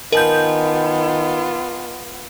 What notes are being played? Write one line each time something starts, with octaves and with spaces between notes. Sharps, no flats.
D#3 B3 F4 A#4 D#5 G#5 A5 G6